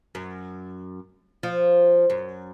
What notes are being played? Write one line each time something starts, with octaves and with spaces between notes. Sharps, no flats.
F#2
F3
F#2